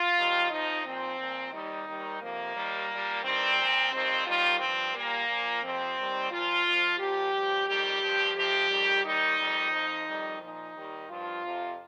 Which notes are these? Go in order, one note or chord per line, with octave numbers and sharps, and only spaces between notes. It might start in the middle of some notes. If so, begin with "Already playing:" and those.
Already playing: F4
D#2 D#3 G3
F2 F3 D#4
A#2 F3 C4
A#2 F3
D#2 D#3 G3 D#4
D#2 D#3 G3
F2 C3 F3 A#3
D#2 D#3 G3
A#2 G3
G2 D#3 G3 C4
A#2 F3
F2 D#3 G3 C4
D#2 D#3 G3 F4
G2 F3 C4
A#2 G3 A#3
A#2 F3
F2 C3 F3 C4
D#2 D#3 G3
A#2 F3 F4
F2 F3
A#2 F3 G4
G2 F3
F2 D#3 G3 G4
G2 F3
F2 C3 F3 G4
F2 D#3 G3
D#2 D#3 G3 D#4
F2 D#3 G3
F2 F3
F2 D#3 G3
A#2 F3 D#4
D#2 D#3 G3
G2 F3 F4
F2 C3 F3